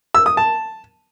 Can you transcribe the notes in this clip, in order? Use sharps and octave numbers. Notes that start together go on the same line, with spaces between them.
E6
D#6
A5